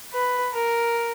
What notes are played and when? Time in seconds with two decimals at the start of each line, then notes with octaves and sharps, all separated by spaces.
0.13 B4
0.53 A#4